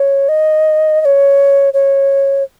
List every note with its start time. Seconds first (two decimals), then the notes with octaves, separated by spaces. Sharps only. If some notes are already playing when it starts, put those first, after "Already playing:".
Already playing: C#5
0.29 D#5
1.01 D#5
1.05 C#5
1.74 C#5